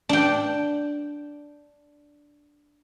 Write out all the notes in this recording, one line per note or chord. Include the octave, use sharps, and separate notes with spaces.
D4 G5